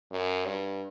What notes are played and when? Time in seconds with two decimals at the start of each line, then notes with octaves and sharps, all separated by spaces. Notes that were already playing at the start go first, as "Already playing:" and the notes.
0.11 F#2
0.46 G2